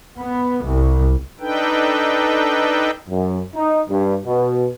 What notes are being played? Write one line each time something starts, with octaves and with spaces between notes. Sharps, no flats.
B3
C2
D4 D#4 A4 B4 G5
F#2
D#4
G2
B2